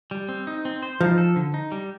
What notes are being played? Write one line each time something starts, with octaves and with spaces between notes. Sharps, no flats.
G3
C4
D#4
C4
C5
F3 D#4
A4
D3
D#4
G3